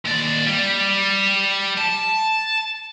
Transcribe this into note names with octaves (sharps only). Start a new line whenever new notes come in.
D#2 D5
G3
A5